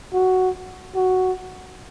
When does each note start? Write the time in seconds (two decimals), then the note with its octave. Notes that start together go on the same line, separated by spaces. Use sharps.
0.13 F#4
0.95 F#4